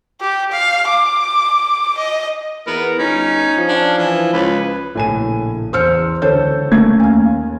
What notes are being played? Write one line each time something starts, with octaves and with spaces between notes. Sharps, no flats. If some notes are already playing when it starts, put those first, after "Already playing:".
G4
F5
D6
D#5
E2 B3 A#4
G1 C#4 D#4
F3
D4
E3
C#2 B4
A#1 A2 C#3 G#5 D#7
E2 C5 E6 F6 C#7
C#2 D3 A4 C5 C#5 G6
A3 A#3 C#4 G#6
D#2 F5 G#5